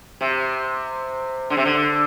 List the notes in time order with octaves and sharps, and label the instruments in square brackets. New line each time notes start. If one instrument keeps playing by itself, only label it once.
[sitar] C3
D3
C3
D3